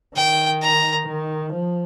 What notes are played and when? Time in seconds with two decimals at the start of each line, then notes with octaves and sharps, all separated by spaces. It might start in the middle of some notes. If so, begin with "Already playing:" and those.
0.16 D#3 G5
0.62 A#5
1.08 D#3
1.53 F3